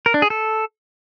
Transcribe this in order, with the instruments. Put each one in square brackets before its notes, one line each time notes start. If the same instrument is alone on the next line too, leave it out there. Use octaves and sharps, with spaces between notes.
[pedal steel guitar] A#4
D4
G#4
A4